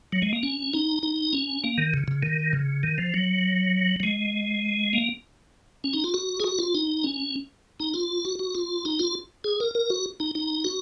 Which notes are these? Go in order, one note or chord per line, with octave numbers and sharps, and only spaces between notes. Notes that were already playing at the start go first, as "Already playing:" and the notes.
F#3
G#3
A#3
C#4
D#4
D#4
C#4
A#3
D#3
C#3
C#3
D#3
C#3
D#3
F3
F#3
F#3
G#3
A#3
C#4
D#4
F4
F#4
G#4
F#4
F4
D#4
C#4
D#4
F4
F#4
F#4
F4
D#4
F4
G#4
A#4
A#4
F#4
D#4
D#4
F#4